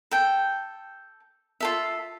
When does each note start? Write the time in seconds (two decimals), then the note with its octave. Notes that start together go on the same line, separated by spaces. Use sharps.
0.11 A4 G5
1.60 F4 A4 E5